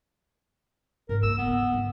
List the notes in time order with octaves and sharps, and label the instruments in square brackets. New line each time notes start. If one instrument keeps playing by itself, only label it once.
[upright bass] G#2 [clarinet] A#4
[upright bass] A#3 [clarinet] E6
[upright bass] D3 [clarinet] B3
[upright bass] G#2